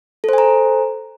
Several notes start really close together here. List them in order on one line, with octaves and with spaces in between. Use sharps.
A4 C5 G#5 A#5